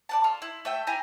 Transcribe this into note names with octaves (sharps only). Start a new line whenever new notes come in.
D5 F#5 A5
F4 A4
E4
A3 E5 G5
E4 G4 G#5 A#5